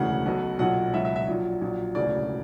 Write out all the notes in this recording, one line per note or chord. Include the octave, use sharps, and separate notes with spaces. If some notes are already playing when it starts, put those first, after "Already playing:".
Already playing: E1 D2 C#3 E3 F#5
B1 B2 F#3
B1 A#2 F#3 F#5
C#2 B2 F#3 E5
E5
E5
A#1 A#2 F#3
A#1 A#2 F#3
E1 D2 C#3 E3 D5